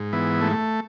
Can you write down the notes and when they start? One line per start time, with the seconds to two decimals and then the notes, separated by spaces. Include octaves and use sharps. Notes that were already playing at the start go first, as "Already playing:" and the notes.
Already playing: G#2
0.13 E3 B3
0.41 A3